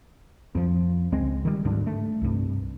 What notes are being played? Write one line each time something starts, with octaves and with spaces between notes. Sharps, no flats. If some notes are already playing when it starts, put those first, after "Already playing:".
F2 F3
C#2 G#3 C4
D#3 G3
D2 G#2 D3 D4
A3
C2 G2